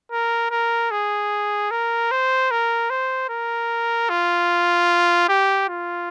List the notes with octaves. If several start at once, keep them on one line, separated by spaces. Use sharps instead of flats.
A#4
A#4
G#4
A#4
C5
A#4
C5
A#4
F4
G4
F4